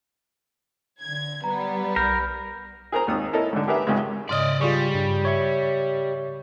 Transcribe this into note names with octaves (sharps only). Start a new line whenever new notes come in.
D3 G#6
G3 B3 A#5
B1 A#4 B5 G6
G#4 A#4 C5 A#5
G#1 D#2 D#6
E4 A4 A#4 C#5 D#5
G#2 D3
G4 G#4 A#4 B4 E5 F#5
G#1 C#2 C#3 G#3
G#2 C#3 D5 D#5 D#6
G3 F4 G#4 C#6
G2
C#5 E5 C#6